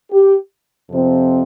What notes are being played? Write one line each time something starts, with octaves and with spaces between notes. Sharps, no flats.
G4
F2 C3 F3 C4